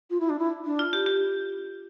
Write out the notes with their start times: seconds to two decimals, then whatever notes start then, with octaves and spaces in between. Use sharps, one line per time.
0.10 F4
0.20 E4
0.29 D4
0.39 E4
0.65 D4
0.79 F4
0.93 G4
1.06 G4